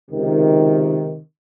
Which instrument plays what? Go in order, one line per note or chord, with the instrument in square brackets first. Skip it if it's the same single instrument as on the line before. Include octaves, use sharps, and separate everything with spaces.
[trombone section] C#2 C3 D#3